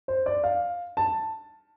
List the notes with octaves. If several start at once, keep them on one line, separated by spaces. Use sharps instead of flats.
C5
D5
F5
A5